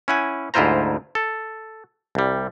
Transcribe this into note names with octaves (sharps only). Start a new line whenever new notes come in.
C#4 E4 F#5 G#5
D2 G#2 E4 F4 C5 A#5
A4
C2 G3